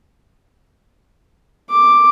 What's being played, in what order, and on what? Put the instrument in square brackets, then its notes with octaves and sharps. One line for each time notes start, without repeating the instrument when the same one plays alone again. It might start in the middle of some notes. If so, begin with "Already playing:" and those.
[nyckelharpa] D6